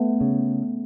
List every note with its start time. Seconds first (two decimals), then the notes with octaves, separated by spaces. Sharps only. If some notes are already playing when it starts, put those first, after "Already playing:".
Already playing: A3 B3
0.21 C#3